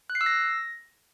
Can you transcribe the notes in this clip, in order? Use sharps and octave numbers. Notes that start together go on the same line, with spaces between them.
F#6
C7
E6
A#6